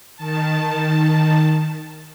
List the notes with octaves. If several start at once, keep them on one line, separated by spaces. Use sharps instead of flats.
D#3 A5